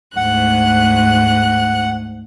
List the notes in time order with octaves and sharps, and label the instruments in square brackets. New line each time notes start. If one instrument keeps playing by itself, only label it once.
[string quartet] D2 G#2 F#6 [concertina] F#5